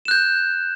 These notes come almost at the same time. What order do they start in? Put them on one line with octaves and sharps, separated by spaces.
E7 F#6 G6